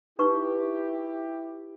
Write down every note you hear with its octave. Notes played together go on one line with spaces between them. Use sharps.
D#4 E4 G4 B4 C#6